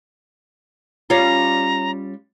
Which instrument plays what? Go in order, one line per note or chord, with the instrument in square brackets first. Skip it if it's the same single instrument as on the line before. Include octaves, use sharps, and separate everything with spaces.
[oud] G3 C#4 F4 [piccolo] A#5